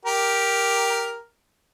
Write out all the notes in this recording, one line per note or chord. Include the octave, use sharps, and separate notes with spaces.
G4 A#4